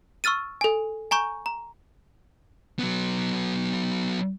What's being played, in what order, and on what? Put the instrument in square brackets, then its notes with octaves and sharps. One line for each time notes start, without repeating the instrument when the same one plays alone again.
[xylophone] C#6 E6 F6 A6 D#7
A4 G#5
G#5 A#5 C#6 G6
A#5
[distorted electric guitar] F#3 B3